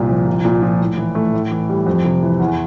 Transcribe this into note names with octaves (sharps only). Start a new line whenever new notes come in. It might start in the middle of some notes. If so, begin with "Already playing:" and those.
Already playing: C2 A#2
F3
C2
A#2
F3
A2
E3
A3
A2
E3
G3
F2
C3
E3
E2